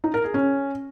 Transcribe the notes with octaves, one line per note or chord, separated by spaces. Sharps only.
D#4
A#4
G#4
C#4